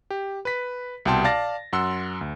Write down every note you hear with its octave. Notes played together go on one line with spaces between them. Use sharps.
G4
B4 B6
C2 B2 G5 A5 C6
D5 F5 A5 A6 A#6
F#2 F#5 C6 E6
D2